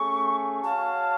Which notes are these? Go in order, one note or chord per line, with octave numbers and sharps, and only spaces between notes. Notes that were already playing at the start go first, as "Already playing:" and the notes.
Already playing: A3 C#4 G#4 C#6
F#4 C#5 F5 A5